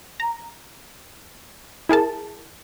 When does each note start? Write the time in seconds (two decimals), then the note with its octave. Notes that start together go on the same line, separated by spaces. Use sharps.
0.20 A#5
1.89 E4 G#4 A#4 A5